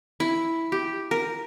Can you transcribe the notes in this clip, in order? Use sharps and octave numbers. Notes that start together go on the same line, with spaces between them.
E4
G4
A#4